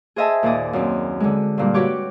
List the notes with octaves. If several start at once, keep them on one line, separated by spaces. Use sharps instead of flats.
G#4 C5 D#5 E5 G#5 A5
D#2 A#2 D5 D#5
F#2 C4
D3 G#3
G2 A#2 G3
F#4 G4 B4 C#5 D6